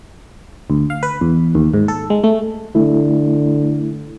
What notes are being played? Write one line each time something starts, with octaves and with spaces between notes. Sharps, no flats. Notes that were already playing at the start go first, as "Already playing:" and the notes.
D2
F5
B4
E2
D#2
G#2
A4
G#3
A3
D3 A3 E4